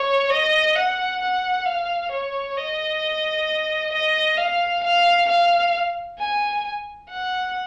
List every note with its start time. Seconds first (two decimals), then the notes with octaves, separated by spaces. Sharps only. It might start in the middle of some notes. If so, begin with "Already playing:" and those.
Already playing: C#5
0.30 D#5
0.76 F#5
1.21 F#5
1.66 F5
2.12 C#5
2.57 D#5
3.93 D#5
4.38 F5
4.84 F5
5.29 F5
6.19 G#5
7.10 F#5